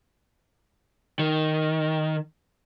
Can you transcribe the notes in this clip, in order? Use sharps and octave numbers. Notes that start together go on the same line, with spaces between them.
D#3